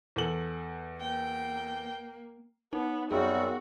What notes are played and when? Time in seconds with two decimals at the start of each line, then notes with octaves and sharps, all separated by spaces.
0.16 E2 A4 F#7
1.00 A#3 G5
2.73 B3 D#4
3.11 F#2 G3 B3 C4 F#4 G#4